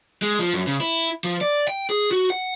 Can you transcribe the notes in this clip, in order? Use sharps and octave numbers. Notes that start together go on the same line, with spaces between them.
G#3
F3
F#2
C#3
E4
F3
D5
G5
G#4
F#4
F#5